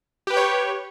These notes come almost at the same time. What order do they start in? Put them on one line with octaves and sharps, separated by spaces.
G4 B4 G5 C#5